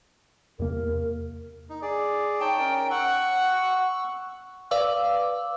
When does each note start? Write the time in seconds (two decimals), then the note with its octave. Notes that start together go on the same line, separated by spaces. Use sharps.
0.59 E2 C3 A#3 A#4
1.70 D#4
1.82 G#4 D5
2.40 D#4 C#5 G5 A5
2.59 C#4 A#4
2.90 F#5 C#6 E6
4.71 B4 D5 F5 D6 E6